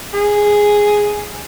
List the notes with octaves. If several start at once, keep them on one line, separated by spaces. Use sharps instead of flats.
G#4